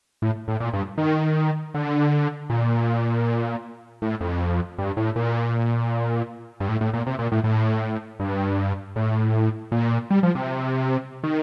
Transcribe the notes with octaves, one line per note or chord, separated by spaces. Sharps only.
A2
A2
A#2
G2
D#3
D3
A#2
A2
F2
G2
A2
A#2
G2
A2
A2
A#2
C3
A#2
A2
A2
G2
A2
A#2
G3
F3
C3
D#3